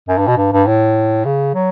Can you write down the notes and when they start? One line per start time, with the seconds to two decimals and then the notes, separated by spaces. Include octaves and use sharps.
0.08 F#2
0.18 G2
0.27 B2
0.37 G2
0.53 G2
0.67 A2
1.25 C#3
1.55 F#3